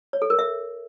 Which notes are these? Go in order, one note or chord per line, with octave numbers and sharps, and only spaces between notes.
C#5
A4
A#4
E5